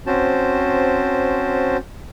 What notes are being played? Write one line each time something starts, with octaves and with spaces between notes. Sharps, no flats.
C4 C#4 F#4 C5 A5